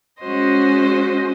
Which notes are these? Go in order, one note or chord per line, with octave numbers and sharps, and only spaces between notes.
G#3 C#4 F#4 C5 D#5